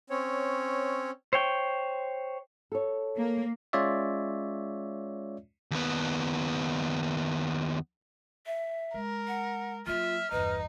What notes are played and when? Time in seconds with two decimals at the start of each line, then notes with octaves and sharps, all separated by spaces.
0.10 C4 C#4 C#5
1.33 C5 C#5 G5
2.72 A4 C#5
3.17 A#3
3.73 G#3 C#4 F4 C#5 D5 E5
5.71 D#2 B3
8.46 E5
8.94 G#3 A#4
9.28 F#5
9.87 F#3 A#3 F4 E5 F6
10.32 G1 E2 D#4 B4